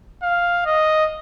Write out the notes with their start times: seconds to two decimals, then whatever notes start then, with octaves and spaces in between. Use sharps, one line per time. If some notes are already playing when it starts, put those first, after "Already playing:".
0.23 F5
0.66 D#5